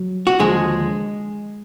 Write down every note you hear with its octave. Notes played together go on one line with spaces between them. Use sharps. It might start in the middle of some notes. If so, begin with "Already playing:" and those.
Already playing: F#3
F#4
D#2 D3 F3 G#3 G#4